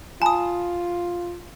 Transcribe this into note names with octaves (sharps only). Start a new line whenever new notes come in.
F4 G#5 A5 B5 D#6